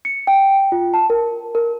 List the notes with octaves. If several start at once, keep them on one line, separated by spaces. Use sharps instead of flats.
C#7
G5
F4
A5
A#4
A#4